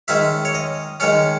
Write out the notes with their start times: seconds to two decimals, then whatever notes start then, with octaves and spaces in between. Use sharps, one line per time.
0.08 D#3 G#3 C#4 E5
0.45 C#5
0.55 D#5
1.00 D#3 G#3 C#4 C#5